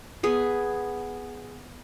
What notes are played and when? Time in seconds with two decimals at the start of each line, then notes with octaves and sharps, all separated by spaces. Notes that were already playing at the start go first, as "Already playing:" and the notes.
0.23 B3 G#4